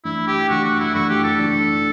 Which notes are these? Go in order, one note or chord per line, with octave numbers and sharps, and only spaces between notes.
F#2 E3 A3 D4 E4
G4
F#2 E3 A3 D4 F#4
F#4
E4
F#2 E3 A3 D4 F#4
G4
A4
F#2 E3 A3 D4